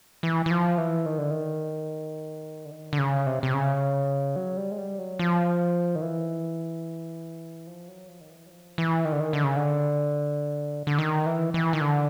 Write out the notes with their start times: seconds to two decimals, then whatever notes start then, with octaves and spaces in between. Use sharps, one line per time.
0.23 E3
0.46 E3
0.51 F3
0.78 E3
1.06 D#3
1.18 D3
1.31 D#3
2.65 D3
2.71 D#3
2.93 D3
2.99 C#3
3.26 C3
3.43 C3
3.54 C#3
4.36 F#3
4.57 G3
4.71 G#3
4.78 G3
4.99 F#3
5.19 F3
5.95 D#3
6.02 E3
7.67 F3
7.88 F#3
8.08 F3
8.21 D#3
8.30 E3
8.46 F#3
8.50 F3
8.78 E3
9.05 D#3
9.12 D3
9.20 D#3
9.33 D3
9.44 C#3
9.56 D3
10.87 D3
10.99 D#3
11.26 E3
11.54 E3
11.73 D#3
11.81 D3